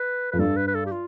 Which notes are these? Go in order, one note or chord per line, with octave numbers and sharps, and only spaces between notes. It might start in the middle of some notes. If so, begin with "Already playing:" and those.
Already playing: B4
F2 B4
G2 A4
B4
B4
A4
G4
F4